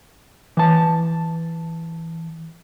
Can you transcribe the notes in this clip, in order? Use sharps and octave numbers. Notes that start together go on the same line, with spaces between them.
E3 A5